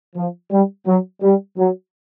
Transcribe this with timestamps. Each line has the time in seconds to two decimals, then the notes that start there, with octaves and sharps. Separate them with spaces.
0.16 F3
0.51 G3
0.86 F#3
1.22 G3
1.58 F#3